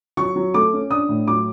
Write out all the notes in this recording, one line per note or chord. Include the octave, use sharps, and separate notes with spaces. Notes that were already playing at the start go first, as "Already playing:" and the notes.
F#3 C#6
F#3
A3 D6
C#4
D4 D#6
A2
F#3 D6